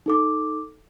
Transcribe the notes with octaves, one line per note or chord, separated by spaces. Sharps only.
D#4 A4 D6